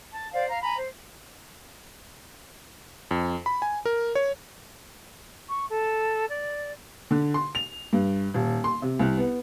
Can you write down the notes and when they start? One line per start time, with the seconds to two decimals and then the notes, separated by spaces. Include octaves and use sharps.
0.11 A5
0.33 C5 D5 F5
0.49 F5 A#5
0.63 G#5 A#5 B5
0.77 C5
3.11 F2
3.46 B5
3.62 G#5
3.86 A#4
4.15 C#5
5.49 C#6
5.69 A4
6.29 D5
7.11 D3
7.34 C6
7.55 F7
7.93 G2
8.34 D#1
8.64 C6
8.82 C3
8.99 C2
9.18 B3